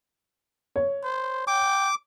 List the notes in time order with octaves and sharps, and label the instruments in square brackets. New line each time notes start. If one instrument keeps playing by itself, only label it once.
[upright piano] C#5
[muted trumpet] C5
[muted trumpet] G5 [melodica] D6